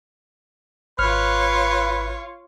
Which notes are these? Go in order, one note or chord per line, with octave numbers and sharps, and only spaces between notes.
G#1 F4 B4 C#5 F6